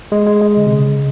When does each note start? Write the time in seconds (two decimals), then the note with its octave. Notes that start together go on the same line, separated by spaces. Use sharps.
0.12 G#3
0.27 G#3
0.42 G#3
0.57 D3
0.66 C3
0.72 C#3